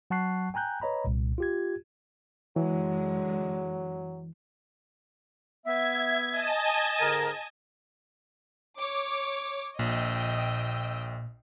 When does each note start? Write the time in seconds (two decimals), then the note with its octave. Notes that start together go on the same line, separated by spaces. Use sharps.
0.10 F#3 F#5 A5 C#6 F#6 C7
0.54 G5 G#5 A#5 F#6 G6
0.81 B4 C#5 D#5 A#5 B5
1.05 C2 A#2
1.38 F4 G4 G#6
2.56 F#2 D3 E3 F#3 G#3
5.66 B3 E5 G#6
6.31 D#5 G#5 A5
7.00 G#2 D3 A#4
8.79 C#5 D6
9.79 A#1 A#2 D#5 G5 E6